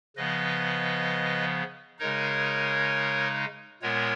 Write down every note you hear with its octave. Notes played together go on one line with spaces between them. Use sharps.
C#3 F3 B3 B4 D#5
C#3 G#3 D#4 A#4 C#5
A#2 G#3 B3 A#4 C#5